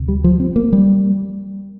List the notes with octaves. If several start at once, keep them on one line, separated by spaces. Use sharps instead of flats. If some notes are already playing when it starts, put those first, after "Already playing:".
Already playing: D2 C3
G3
F3
C4
A#3
G3